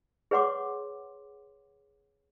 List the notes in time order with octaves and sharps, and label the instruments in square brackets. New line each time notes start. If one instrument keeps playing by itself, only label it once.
[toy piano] G#4 B4 C#5 F#5 C6 D6